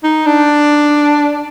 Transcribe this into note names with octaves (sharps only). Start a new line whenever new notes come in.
D#4
D4